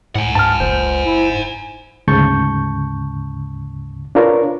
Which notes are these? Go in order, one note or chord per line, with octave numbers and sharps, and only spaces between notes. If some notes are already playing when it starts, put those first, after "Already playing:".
C#2 A2 F#5 G#5
G#2 A5 F6
F#1 C5
E4
G#2
D2 G#2 C#3 A5 C#6 G6
D4 F4 A#4 B4 C#5